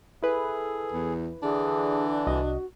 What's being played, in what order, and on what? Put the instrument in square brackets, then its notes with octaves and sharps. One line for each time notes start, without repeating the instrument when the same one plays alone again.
[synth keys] E4 B4 [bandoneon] G#4 [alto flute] A4
[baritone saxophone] E2
[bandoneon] D3 E3 [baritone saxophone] D4 [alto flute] G#4
[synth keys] C2 D#5 [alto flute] F#4